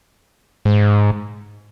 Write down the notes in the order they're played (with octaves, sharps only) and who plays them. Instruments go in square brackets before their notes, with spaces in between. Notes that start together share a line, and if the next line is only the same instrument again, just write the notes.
[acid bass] G#2